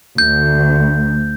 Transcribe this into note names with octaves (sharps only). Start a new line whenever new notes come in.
D2 G6